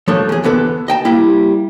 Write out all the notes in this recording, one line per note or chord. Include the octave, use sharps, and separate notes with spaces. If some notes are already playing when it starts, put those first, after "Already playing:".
F3 A3 D4 A4 C#5
E2 G#4
E2 D3 B3 A4
D#5 G5 A5
G3 A#3 E4 G4